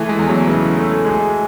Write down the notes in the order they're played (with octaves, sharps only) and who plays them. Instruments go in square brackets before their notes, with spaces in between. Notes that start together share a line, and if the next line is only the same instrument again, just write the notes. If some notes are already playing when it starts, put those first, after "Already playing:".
Already playing: [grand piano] E3 G#4 [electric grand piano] A3
[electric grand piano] G#3
[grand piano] E2
[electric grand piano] F#3
[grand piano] C#3 [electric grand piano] E3
[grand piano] A3
G#3